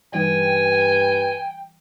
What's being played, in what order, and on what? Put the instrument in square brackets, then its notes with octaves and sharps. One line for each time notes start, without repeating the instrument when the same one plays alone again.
[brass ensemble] G2 B4 [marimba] E3 G3 D#4 [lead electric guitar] G5 [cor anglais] G#5